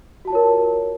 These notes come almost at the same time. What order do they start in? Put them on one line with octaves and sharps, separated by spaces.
F#4 A5 F4 C#5 A#4